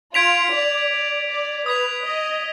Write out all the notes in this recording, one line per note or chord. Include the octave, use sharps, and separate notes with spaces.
F4 G#6 B6 D7 F7
D5
D5
D5
B4 D#6 G#6 B6 F7
D#5